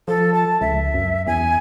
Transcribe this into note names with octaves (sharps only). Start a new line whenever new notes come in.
F3 A4
A5
C#2 E5
F#2
E2 G#5